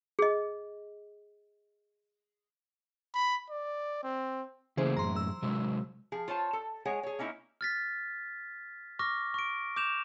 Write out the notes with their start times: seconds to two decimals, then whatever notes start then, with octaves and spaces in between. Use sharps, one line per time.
0.19 G#4 D#5
3.14 B5
3.50 D5
4.03 C4
4.77 C#3 E3 A3 A#3 G#4 C5
4.97 F#2 A2 A#5 C6
5.16 E6
5.42 C3 F#3 G#3
6.12 F3 G#4
6.28 F4 C5 C#5 A5
6.53 A4
6.85 G#3 G#4 C#5 F#5
7.03 G#4 C#5
7.19 A#3 C#4 D#4 E4
7.61 F6 A6 B6
8.99 C#6 D6 F6 A#6
9.34 C#6 D7
9.77 D6 G6 E7 F7